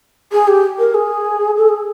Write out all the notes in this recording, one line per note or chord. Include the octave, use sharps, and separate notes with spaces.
G#4
G4
A#4
G#4
A4
G#4